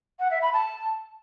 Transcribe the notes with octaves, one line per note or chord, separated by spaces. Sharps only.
F#5
E5
B5
A5